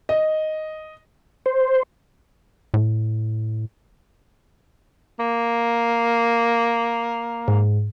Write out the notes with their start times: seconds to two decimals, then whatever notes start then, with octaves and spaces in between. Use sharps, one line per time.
0.09 D#5
1.46 C5
2.74 A2
5.20 A#3
7.48 G#2